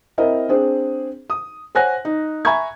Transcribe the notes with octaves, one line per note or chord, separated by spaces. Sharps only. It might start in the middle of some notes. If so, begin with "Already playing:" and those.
C4 E4 A#4 D#5
C4 D4 G#4 C5
D#6
C5 C#5 F#5 G#5 F#6 A#6
D#4
E5 G#5 A#5 B5 C#6 G#6